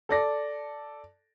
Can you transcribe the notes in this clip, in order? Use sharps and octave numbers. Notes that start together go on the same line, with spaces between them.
A4 D5 A#6